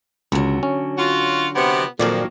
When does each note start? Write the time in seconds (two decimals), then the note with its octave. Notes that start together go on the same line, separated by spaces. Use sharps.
0.32 C#2 D3 F#3
0.63 C#4
0.98 F4 F#4
1.55 C3 B3
1.99 F2 A#2 D#3 F3 F#3 A#3 D5